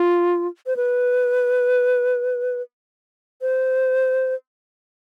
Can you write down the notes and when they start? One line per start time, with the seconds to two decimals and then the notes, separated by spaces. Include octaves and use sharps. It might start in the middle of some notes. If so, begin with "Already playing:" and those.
Already playing: F4
0.67 C5
0.77 B4
3.42 C5